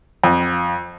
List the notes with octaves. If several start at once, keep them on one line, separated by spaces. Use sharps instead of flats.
F2